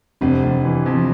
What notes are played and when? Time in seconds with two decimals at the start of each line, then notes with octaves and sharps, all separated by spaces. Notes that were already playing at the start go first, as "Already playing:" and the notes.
0.21 F1 C4 D4
0.43 F1
0.64 E3
0.86 F2